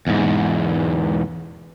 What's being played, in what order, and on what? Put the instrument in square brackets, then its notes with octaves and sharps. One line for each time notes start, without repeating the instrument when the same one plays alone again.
[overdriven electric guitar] E2 G#2